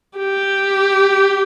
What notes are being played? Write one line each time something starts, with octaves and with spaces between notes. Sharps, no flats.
G4